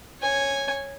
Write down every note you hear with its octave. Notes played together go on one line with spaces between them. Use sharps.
C#5 G#5